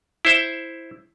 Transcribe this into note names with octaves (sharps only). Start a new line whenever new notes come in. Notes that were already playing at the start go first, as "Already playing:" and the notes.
E4 C5 E5